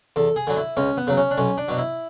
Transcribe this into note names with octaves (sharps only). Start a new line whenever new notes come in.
E2 A4
G#4
D3 F#3
E4
C#2 C#4
B3
C#3 F#3
C#4
D4
B1 C#4
D4
B2 F#3
E4